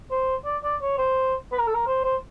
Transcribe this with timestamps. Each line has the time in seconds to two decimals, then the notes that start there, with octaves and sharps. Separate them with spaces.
0.11 C5
0.45 D5
0.64 D5
0.82 C#5
0.98 C5
1.52 B4
1.59 A#4
1.67 A4
1.74 A#4
1.87 C5
2.04 C5